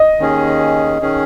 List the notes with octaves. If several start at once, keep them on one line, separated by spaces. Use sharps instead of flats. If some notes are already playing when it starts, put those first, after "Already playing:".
Already playing: D#5
D#2 D#3 C#4 G#4
D#3 C#4 G#4